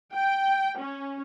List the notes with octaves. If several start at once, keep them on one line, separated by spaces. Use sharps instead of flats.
G5
C#4